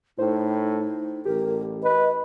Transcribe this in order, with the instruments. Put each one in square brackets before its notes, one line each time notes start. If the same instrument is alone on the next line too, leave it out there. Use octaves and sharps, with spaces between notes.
[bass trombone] A2 [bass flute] D#4 [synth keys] C5
[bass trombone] A1 [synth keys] G4 [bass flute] A#4
[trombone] B4 [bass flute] D#5